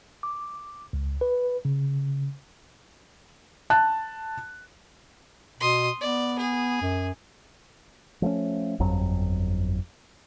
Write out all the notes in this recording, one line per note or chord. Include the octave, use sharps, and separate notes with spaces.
D6
C#2
B4
C#3
A5 F#6
B2 C6 D#6
B3 D5
G#4
F#2
F3 A3 C#4
G1 F2 F#3